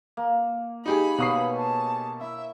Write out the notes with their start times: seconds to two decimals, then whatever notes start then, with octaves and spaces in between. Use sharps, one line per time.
0.17 A#3
0.86 D#4 G4 G#4 B5
1.18 B2 A#3 B4 C#5 D#6 C7
1.57 A5
2.21 E4 E5